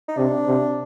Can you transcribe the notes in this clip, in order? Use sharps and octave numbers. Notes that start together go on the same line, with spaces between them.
D#4
C3 D4
C3